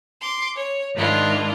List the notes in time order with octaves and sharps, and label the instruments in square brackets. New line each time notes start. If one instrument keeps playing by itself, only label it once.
[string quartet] C6 D6
C#5
G#2 D#3 G#3 D4 E4 F4